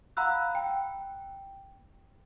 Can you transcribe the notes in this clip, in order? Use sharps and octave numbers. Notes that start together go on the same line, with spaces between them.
F5 F#5 A#5 B5 E6 F#6
G5